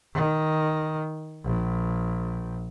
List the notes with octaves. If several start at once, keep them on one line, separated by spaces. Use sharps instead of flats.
D#3
A#1